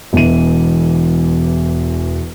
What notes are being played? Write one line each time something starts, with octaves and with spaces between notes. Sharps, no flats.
E1 E2 E3 D#7